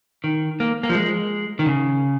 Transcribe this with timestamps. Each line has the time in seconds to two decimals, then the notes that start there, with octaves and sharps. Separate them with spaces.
0.24 D#3
0.60 A#3
0.83 A#3
0.89 F3
0.95 G#3
1.59 D#3
1.66 C#3